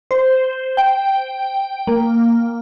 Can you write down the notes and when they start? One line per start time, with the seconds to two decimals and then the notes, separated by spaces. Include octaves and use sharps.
0.11 C5
0.77 G5
1.87 A#3